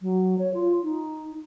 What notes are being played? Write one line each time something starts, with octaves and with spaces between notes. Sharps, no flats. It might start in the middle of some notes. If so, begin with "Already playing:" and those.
F#3
C#5
F4
D#4